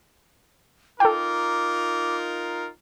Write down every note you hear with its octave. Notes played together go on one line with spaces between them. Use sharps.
D#4 F4 A4 A#4 G5 D6